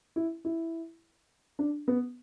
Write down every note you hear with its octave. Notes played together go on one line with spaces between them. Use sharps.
E4
E4
D4
B3